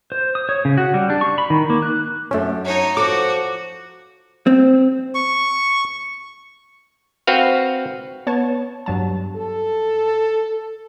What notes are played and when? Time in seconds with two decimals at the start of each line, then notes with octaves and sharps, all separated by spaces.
0.12 C5
0.35 D#6
0.49 C#5
0.65 C#3
0.77 F#4
0.94 G3
1.10 D4
1.21 C#6
1.38 B5
1.50 D#3
1.70 A#3
1.82 F#6
2.31 F#2 A3 C#4 D4
2.65 D#4 C#5
2.97 F3 F#4 A4 D6
4.47 C4
5.15 C#6
7.27 C4 F#4 B4 F5
8.27 B3 C#5 A5
8.86 G2 F#3 A5
9.36 A4